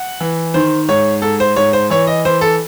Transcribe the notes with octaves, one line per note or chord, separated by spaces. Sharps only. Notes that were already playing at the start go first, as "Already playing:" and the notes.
Already playing: F#5
E3
D#3 C5
G#2 C#5
G#2 A4
C5
G#2 C#5
C5
E3 C#5
D#5
E3 C5
A4